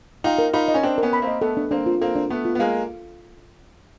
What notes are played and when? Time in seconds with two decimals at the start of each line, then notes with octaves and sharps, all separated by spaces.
0.24 D#4 F4 G5
0.38 A#4
0.53 D#4 F4 B5
0.68 D#5
0.74 C#4
0.83 C4 D4 G5
0.98 B3 C#4 A#4
1.13 B5
1.22 A#3 C4
1.27 D#5
1.41 A3 B3 A4
1.57 D4
1.71 A#3 C4 D4
1.86 F4
2.01 A#3 C4 A4
2.15 D4
2.30 A3 B3 D4
2.45 F4
2.55 B3
2.59 G#3 A#3 F5
2.74 A4